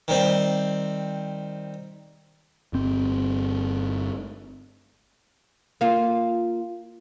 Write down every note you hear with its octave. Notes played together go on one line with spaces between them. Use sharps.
D#3 G3 C4
G1 C4
A#3 F4